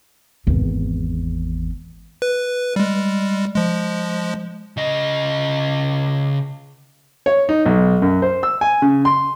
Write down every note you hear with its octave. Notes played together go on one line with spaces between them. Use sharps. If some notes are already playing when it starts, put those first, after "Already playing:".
G#1 E2
B4
G3 G#3
F3 G#3
C#3 D#5
C#5
D#4
B1
F#2
C5
E6
G#5
C#3
C6